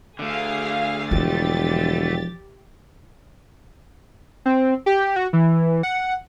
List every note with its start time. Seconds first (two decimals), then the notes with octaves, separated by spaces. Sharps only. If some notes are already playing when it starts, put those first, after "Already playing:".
0.19 D3 A3 G#4 F5
1.11 E1 E3 F3 G4 A6
4.45 C4
4.86 G4
5.16 F#4
5.33 E3
5.83 F#5